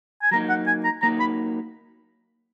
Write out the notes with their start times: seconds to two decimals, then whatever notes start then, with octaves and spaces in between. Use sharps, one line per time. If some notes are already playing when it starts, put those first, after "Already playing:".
0.23 G#5
0.31 F#3 A#3 D#4 A#5
0.49 F#5
0.67 G#5
0.85 A#5
1.02 F#3 A#3 D#4 A#5
1.20 B5